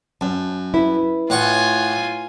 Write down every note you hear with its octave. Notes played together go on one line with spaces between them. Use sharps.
F#2 A5
E4 B4
A2 F4 F#5 G#5 C#6